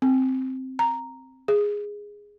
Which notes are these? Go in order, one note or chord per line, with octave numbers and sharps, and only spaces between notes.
C4
A#5
G#4